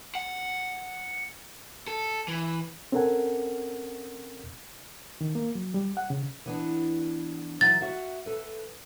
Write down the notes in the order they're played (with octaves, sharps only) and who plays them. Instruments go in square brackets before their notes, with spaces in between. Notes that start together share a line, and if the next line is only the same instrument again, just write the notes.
[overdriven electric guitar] F#5
A4
E3
[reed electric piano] C4 C#4 A4 A#4 F#5 G#5
D#3
A#3
F#3
G3
F#5
C#3
[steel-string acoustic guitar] E3 B3 D4
[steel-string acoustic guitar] E3 F#3 D#4 [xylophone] A6
[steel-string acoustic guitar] F#4 E5 F#5
A4 B4